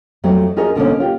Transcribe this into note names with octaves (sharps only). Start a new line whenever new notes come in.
F2 F#3 A3 C4
C#4 F4 F#4 G#4 A#4 D#5
B2 D3 A#3 C#4
F4 G4